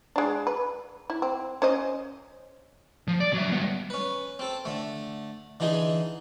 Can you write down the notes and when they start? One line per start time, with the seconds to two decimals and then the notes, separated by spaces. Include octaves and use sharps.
0.16 G#3 D4
0.47 B4
1.10 E4
1.22 C4
1.62 C#4 C5 D#5
3.08 F3
3.20 D5
3.33 F#3 E5
3.52 G3 B3
3.90 C#4 B4
4.39 C4 A4
4.65 D3 A3
5.60 D3 E3 D#4 G#4 G#5 C6